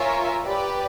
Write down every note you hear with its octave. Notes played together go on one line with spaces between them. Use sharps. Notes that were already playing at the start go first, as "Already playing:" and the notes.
Already playing: F4 A#4 C#5 E5 G#5
G4 B4 D5